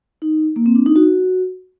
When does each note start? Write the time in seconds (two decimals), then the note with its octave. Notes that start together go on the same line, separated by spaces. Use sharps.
0.22 D#4
0.56 A#3
0.66 C4
0.76 D4
0.86 D#4
0.96 F#4